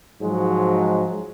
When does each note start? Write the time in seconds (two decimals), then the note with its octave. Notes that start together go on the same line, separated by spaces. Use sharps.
0.21 G#2 F3 F#3 G#3